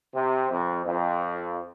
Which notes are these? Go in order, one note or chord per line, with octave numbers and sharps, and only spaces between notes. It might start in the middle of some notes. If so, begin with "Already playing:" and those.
C3
F2
F2